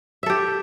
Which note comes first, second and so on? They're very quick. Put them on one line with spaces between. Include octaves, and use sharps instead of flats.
E5 A4 G4